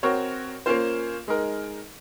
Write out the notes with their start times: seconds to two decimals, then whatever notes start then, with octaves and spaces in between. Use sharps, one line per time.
0.03 C4 F#4 A#4 C#5
0.66 A#3 C#4 F4 C5
1.28 G#3 D#4 A#4